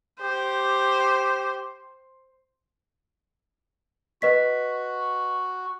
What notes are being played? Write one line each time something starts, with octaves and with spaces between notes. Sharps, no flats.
G4 C5
F#4 B4 D#5 B6